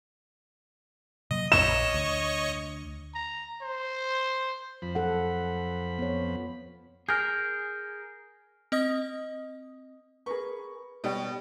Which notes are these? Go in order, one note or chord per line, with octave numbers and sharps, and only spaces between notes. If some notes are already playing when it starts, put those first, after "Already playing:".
C3 F#3 A#3 D#5
A#1 C#5 D#5 C#6 E7
D2
A#5
C5
F2 F3 B5
F#3 A4 F#5
B3 C#5
G#4 A#4 F6 G6
C4 D#5 D#6 A#6
G#4 A#4 B4 C#6
B2 G3 C#5 G5